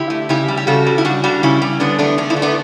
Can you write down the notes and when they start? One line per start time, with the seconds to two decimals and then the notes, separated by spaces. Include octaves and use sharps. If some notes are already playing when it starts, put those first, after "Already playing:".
Already playing: D3 E4 G4
0.10 A3
0.29 C#3 E4 G4
0.48 G3
0.57 G4
0.67 C#3 F#4 A4
0.87 G3
0.98 E4
1.05 C#3 D4 F#4
1.24 G3 D4 F#4
1.43 C#3 C#4 E4
1.62 G3
1.80 D3 B3 D4
1.99 A3 B3 D4
2.18 D3 D4
2.30 E4
2.37 A3
2.42 B3 D4